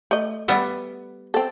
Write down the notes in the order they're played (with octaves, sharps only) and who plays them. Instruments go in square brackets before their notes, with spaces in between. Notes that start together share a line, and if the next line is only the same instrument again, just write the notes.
[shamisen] A3 D#5
[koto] G3 B3 E5
[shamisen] C4 A4